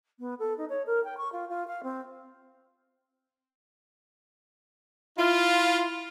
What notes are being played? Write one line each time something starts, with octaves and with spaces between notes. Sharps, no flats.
B3
A4
D#4
C#5
A#4
G5
C#6
F4
F4
F5
C4
E4 F4